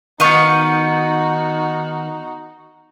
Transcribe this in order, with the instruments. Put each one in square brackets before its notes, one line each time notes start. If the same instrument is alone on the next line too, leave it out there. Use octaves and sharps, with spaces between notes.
[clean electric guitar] D#3 B3 [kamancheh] D#4 F#4 [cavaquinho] D#5 F5 C#6